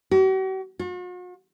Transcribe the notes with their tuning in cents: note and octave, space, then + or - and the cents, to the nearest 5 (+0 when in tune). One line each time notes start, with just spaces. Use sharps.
F#4 +45
F#4 -45